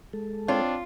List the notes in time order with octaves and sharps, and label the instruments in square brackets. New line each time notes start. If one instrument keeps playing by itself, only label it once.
[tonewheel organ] G#3 A4
[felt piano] C4 C#5 [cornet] D4 [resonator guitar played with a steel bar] F4